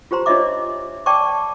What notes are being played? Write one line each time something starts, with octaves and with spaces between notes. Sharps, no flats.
F4 G4 C5 A#5 C6
D4 F4 C#5 D#5 E5 D6
D5 G5 A5 C#6 D6